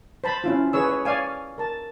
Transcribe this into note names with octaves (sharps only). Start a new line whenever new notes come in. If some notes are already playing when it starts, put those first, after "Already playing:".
C5 A5 B5
C#4 E4 F4
G#4 B4 C#5 E6
C#5
C#5 D5 F5 G#5
A#4 A5